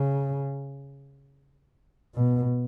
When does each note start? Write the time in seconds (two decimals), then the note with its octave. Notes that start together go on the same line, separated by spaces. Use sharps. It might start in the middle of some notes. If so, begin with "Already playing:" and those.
Already playing: C#3
2.15 B2